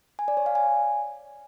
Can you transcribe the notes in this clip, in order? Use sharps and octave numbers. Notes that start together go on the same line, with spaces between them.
G#5
D5
C#5
F5
G#5